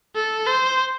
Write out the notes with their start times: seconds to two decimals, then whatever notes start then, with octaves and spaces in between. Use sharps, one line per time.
0.15 A4
0.47 C5